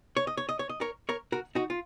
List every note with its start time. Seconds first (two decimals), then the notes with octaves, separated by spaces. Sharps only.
0.17 C#5
0.27 D#5
0.37 C#5
0.49 D#5
0.59 C#5
0.69 D#5
0.81 A#4 C#5
1.09 A#4 C#5
1.32 F#4 A#4
1.55 D#4 F#4
1.70 F4